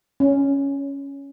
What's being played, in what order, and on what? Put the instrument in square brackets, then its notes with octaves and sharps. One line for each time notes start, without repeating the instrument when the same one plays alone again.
[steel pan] C#4